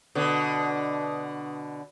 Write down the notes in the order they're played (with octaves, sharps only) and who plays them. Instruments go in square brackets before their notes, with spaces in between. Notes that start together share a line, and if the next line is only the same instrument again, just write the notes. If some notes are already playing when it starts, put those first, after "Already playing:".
[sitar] B2 D3